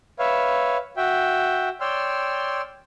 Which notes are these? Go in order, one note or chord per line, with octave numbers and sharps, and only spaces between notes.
B4 C#5 E5 F5
F#4 E5 G5
C#5 D5 G5 C6 E6 F6